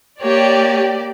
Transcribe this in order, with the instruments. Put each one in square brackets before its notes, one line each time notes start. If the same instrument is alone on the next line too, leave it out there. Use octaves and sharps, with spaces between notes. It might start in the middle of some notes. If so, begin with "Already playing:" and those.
[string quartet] A#3 [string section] G4 D5 [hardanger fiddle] C#5